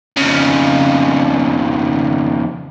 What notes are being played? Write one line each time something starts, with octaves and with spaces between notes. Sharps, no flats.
F2 C#3